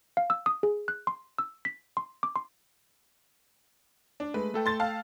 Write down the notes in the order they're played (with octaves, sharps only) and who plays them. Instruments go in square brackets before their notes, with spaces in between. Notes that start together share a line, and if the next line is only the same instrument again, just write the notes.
[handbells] F5
E6
D#6
G#4
F#6
C6
E6
B6
C6
D6
C6
[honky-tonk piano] D4
[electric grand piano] G#3 A3 [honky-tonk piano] B4
[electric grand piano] A3 A4 G5
[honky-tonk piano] C6 A6
F5 A5 F6